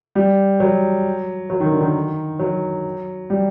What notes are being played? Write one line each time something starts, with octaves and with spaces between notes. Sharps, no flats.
G3
F#3
F#3
D#3
D3
D#3
F#3
G3